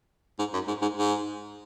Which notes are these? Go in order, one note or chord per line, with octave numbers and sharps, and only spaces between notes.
G#2
F#2
G#2
G#2
G#2